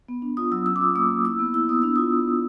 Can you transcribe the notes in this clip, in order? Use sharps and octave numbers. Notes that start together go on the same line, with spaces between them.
B3
D4
F4 D#6
F#3 E6
C#4 E6
D6
F4 D#6
A#3 D#6
A#3
E4 E6
B3
E4 E6
B3 D#6
D4 E6
F4 D#6
B3
B3